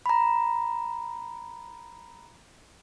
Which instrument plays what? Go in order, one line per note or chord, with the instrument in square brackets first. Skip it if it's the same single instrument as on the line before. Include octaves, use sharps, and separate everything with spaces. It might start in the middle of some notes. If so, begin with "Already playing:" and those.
[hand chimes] A#5 B5